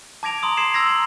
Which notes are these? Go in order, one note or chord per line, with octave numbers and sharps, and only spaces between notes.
A5 D6 G#6 A#6 D7 F7
A#5 C6 D#6
C6 G#6 C7 E7
E6 G#6 A#6 C7 F7
A#5 C6